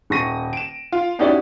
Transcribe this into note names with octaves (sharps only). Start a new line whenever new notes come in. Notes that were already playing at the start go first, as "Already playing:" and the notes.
D#1 C#6 A#6 D#7
D7 E7
F4
C#4 D#4 E4 F#4 G4 D5